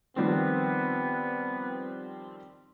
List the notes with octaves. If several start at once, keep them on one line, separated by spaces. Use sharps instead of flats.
D#3 F3 G3 B3 C4